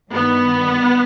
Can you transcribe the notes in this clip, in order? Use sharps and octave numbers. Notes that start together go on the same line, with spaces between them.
G2 D#3 B3